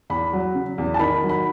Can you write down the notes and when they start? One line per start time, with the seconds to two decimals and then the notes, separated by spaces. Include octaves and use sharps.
0.10 E2 B5
0.33 F#3
0.55 C#3
0.78 E2
0.94 A5
0.99 D#3 B5
1.23 F#3
1.29 B5